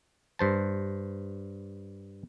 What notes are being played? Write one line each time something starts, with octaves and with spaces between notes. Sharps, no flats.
G2 C5 A5